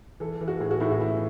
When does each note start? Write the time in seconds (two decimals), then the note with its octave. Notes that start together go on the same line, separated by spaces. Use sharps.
0.20 E3 A4
0.41 E3
0.48 F#4
0.60 A2 G#4
0.71 F#4
0.80 A2 E4
0.91 F#4
1.00 E3 E4